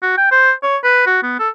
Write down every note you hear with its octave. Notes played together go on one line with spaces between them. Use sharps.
F#4
G5
C5
C#5
B4
F#4
B3
A4